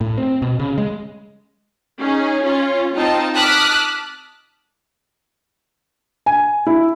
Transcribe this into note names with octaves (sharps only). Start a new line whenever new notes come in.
A2
C4
B2
C#3
G#3
C#4 D#4 G#4
C#4 F4 C#5
C4 D#4 F4 D#5 G5 A5
A5 D6 D#6 F6 F#6 B6
G#5
E4